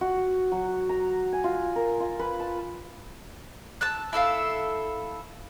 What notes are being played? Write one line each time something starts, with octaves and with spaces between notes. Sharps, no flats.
F#4
F#3
A#5
G#5
F4
A#4
F4
B4
A5
A5 E6 F#6
E4 A4 E5 F5